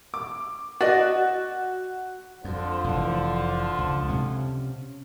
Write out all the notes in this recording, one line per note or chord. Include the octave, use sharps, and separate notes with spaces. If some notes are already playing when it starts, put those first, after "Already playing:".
D6
F#4 D5 D#5
F2 D3 F3
F1 E3
C#2
C3 C#4